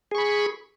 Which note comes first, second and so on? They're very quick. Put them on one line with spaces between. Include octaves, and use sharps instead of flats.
G#4 C#6 B5